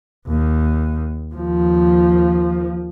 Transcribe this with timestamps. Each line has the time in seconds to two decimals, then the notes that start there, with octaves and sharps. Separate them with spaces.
0.27 D#2
1.34 D#2 F3